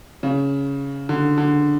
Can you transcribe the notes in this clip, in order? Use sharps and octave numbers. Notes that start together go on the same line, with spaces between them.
C#3
D3
D3